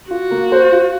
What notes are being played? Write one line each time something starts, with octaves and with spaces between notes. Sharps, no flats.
F4 F#4
A#3
C5
F4